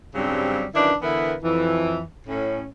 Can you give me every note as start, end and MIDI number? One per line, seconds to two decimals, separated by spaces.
0.15 0.66 43
0.15 0.66 49
0.15 0.66 54
0.15 0.66 55
0.15 0.66 60
0.75 0.93 42
0.75 0.93 50
0.75 0.93 51
0.75 0.93 62
0.75 0.93 64
0.75 0.93 71
1.02 1.34 50
1.02 1.34 52
1.02 1.34 59
1.02 1.34 64
1.02 1.34 70
1.02 1.34 71
1.42 2.03 41
1.42 2.03 52
2.27 2.65 45
2.27 2.65 61